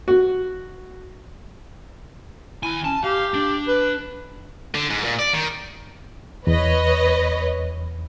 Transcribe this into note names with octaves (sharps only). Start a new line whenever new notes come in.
F#4
D#2 E4 G#5
C#4 A5
G4 F5
D4
B4
D3
G#2
A#2
D5
D#3
E2 B4 C#5 D#5